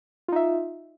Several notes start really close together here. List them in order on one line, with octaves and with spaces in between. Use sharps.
F4 D#4 E5